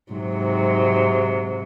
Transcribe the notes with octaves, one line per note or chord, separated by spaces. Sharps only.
G#2 C3 F#3